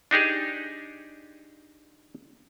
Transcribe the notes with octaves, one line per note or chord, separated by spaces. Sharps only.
D4 D#4 G4 G#4